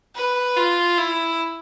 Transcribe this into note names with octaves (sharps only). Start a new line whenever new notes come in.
B4
F4
E4